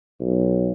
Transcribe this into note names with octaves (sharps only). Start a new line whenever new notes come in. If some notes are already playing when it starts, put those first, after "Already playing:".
B1